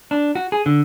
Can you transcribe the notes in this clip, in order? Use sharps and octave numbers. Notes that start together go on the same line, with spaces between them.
D4
F#4
G#4
D3